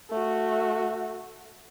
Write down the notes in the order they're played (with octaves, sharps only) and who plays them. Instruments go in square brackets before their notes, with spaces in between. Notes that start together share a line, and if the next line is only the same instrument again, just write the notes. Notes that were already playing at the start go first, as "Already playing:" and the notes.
[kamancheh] A3 F#4